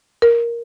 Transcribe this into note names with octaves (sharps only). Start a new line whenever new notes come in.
A#4